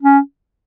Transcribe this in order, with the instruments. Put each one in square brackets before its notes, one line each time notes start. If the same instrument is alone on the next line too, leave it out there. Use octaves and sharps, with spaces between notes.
[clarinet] C#4